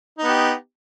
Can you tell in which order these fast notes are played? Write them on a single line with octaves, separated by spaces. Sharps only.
D#4 B3 G4